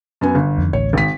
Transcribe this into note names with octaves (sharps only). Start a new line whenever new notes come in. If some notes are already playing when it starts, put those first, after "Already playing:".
F#2 B3 G#5
G1
F2 D#3
A1 D2 C#5
G#1 B6